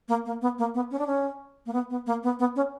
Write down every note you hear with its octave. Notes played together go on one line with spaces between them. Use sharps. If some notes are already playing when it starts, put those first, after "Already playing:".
A#3
A#3
B3
A#3
B3
C#4
D4
C#4
A#3
B3
B3
A#3
B3
B3
C#4